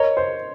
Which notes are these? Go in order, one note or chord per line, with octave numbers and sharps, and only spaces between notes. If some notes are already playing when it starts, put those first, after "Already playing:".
Already playing: A#4 C#5 D#5 A#5
C5